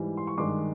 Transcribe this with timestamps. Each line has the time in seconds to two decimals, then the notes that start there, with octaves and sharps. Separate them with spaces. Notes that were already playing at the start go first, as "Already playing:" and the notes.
Already playing: G#2 E3 G3
0.17 C6
0.27 C#6
0.37 G2 D#3 G#3 C6 D6